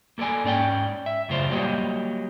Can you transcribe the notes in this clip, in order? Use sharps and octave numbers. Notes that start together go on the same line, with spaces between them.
A#3 A4 A#4 D5 G#5
G#2 C#4 D5 G5
E5
F#2 A2 C#3 F4 C5 D5
F#3 G3 A#3 G4 D#5